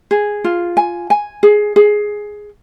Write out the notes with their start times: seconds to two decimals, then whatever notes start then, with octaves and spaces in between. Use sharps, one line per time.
0.11 G#4
0.44 F4
0.77 G#5
1.10 G#5
1.43 G#4
1.76 G#4